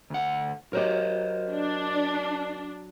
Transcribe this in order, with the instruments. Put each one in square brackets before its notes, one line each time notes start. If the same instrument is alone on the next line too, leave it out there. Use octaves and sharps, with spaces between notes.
[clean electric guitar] D2 F#5
[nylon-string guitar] F#3 G4 [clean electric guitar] A#4 C5 D#5
[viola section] D4